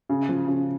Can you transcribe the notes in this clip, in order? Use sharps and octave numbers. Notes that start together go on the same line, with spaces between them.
C#3
F3
C#3